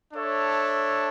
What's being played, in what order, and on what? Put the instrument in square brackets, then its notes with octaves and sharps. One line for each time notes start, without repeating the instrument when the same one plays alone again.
[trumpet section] D4 A4 C#5 E5